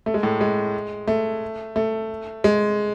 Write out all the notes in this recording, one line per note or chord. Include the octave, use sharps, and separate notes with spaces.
A3
G#3
A2
G#3
A3
A3
G#3